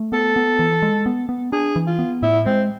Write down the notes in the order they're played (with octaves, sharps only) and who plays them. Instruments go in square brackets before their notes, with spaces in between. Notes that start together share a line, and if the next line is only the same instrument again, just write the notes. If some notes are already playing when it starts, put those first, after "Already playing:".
Already playing: [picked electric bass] A3
[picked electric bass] B3 [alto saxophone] A4
[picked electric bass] B3
E3
G#3
B3
B3
[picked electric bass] D4 [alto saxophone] G#4
[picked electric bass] E3
[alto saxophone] F4
[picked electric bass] B3
[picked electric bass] A2 [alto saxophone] E4
[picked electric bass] G#3 [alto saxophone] C4